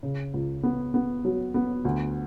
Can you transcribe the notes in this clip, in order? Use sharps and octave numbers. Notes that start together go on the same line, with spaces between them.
C#3
C#2
B3
B3
F#3
B3
D2